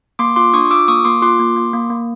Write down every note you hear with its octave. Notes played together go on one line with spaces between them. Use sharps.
A#3 C6 D6
F4 C6 D6
D4 C#6 D#6
F4 D6 E6
A#3 C#6 D#6
A#3 C6 D6
F4 C6 D6
A#3
A#3
A#3
A#3